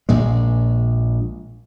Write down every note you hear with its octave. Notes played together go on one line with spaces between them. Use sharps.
A#1 A#2 G#3